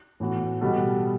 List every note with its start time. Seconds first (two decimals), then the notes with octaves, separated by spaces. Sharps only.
0.20 A2 E3 B3 F#4
0.61 B2 G3 B3 F#4 A4